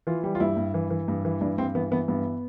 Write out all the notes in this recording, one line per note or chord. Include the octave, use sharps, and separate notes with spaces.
E3 F4
G3
F4
G2 E4
G2
E3
E3
G2
E3
G2 D4
G2 C4
E3 B3
E3 B3
G2 B3